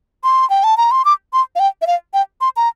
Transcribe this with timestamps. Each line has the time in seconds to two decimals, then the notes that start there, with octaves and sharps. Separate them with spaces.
0.24 C6
0.50 G5
0.64 A5
0.77 A#5
0.91 C6
1.05 D6
1.33 C6
1.56 F5
1.59 G5
1.82 E5
1.87 F5
2.14 G5
2.41 C6
2.57 A#5